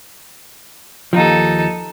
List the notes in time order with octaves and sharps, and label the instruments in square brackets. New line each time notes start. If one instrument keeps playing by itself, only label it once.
[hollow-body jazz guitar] D#2 F3 [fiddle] D#4 A4